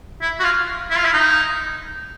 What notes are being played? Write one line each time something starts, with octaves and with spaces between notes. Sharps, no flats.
E4
F#4
F4
E4
F4
E4
D#4